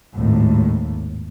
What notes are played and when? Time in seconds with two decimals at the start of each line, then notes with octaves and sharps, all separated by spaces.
0.17 G#1 D#2 A2